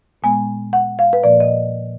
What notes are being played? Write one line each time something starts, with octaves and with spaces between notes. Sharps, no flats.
A#2 G#3 B3 G#5
F#5
F5
B4
A#2 F3 A#3 D5
D#5